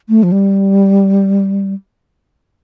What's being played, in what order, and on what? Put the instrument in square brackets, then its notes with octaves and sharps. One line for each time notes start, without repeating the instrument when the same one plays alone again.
[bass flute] A3
F3
G3